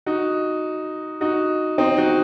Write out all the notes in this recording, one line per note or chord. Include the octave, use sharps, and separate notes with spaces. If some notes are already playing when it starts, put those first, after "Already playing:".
D#4 F#4
D#4 F#4
C4 D#4
D#4 F#4